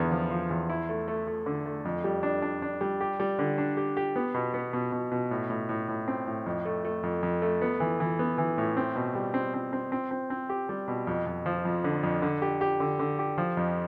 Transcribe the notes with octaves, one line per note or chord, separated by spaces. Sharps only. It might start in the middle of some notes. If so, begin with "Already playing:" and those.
Already playing: E2 D3 B3
F3
F3
E2
E4
A3
A3
A3
D3
A3
F2
G3
D4
D4
D4
G3
G4
G3
D3
D4
G4
G4
B3
B2
B3
B2
B2
B2
A2
A2
A2
A2
C4
A2
F2
A3
A3
F2
F2
A3
B3
E3
E3
B3
E3
A2
C4
B2
G3
C4
C4
C4
C4
C4
C4
G4
G3
B2
F2
F2
F3
F2
D3
F2
D3
G4
G4
D3
D3
G4
F3
F2